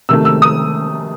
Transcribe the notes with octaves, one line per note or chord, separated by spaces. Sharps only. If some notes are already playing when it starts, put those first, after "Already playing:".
C3 D#3 A3 E6
E6
D#6